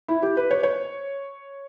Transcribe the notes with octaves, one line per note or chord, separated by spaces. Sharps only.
E4
G4
B4
C#5
C#5